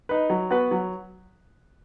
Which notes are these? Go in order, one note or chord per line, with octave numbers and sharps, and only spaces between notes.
D#4 B4
F#3
B3 F#4 B4
F#3